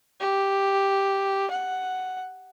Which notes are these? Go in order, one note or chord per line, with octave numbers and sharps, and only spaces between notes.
G4
F#5